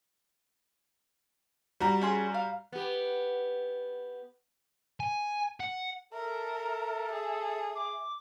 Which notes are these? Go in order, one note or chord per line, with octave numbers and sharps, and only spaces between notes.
G3 F#4 A#5
C#4 G#4 C6
F5
B3 G4
G#5
F#5
A4 A#4 E5
G#4
D6